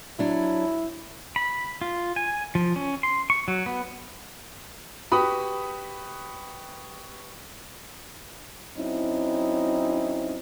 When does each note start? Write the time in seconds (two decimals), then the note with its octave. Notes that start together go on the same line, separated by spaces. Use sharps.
0.19 F#3 D4 E4
1.36 B5
1.81 F4
2.16 G#5
2.55 F3
2.76 C#4
3.03 C6
3.30 C#6
3.48 F#3
3.66 B3
5.12 F#4 G4 B4 B5 D#6
8.77 F#3 C4 C#4 D#4 E4